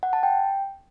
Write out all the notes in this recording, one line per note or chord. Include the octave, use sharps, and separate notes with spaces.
F#5
A5
G5